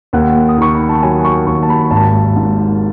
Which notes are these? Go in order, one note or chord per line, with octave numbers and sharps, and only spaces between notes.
D#2 F#5
D#6
D#3 C#6
B5
A5
F#3 G#5
C#6
D#2 C#6
A5
B5
G#1 A5
G#2